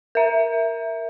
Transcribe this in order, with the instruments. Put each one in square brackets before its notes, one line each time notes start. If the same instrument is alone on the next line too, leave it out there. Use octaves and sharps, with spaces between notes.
[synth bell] A#4 E5